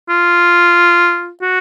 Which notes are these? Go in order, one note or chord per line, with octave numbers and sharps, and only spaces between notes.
F4
F#4